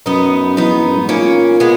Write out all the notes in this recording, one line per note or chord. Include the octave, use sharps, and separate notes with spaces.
F#2 B3 D#4
E2 B3 D#4
E2
F#2
G#2
A#2 A#3 C#4
G#3 B3